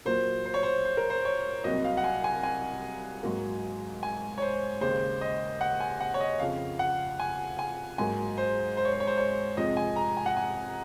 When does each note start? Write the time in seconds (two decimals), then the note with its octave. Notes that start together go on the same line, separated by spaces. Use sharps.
0.05 A#2 F#3 A#3 C5
0.46 C5
0.54 C#5
0.63 C5
0.85 C5
0.97 A#4
1.10 C5
1.25 C#5
1.64 C2 C3 F#3 A#3 D#5
1.85 F5
1.97 F#5
2.04 G#5
2.24 G#5
2.43 G#5
3.23 G#2 F#3 A#3
4.03 G#5
4.38 C#5
4.42 C5
4.81 D#2 C#3 G#3 C5
5.21 D#5
5.61 F#5
5.80 G#5
6.00 F#5
6.14 C#5
6.20 D#5
6.40 F2 C#3 F3 F5
6.79 F#5
7.20 G#5
7.59 G#5
7.98 G#2 F#3 A#3 G#5
8.38 C5
8.77 C5
8.85 C#5
8.93 C5
9.00 C#5
9.07 C5
9.18 C#5
9.57 F2 C3 F3 G#3 D#5
9.77 G#5
9.96 A#5
10.17 G#5
10.26 F#5
10.36 G#5